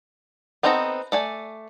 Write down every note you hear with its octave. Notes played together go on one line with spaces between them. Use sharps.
B3 C4 D#4 A4 A#5
A3 D5 G#5